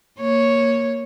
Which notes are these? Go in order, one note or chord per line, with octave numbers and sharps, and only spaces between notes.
A#3 C#5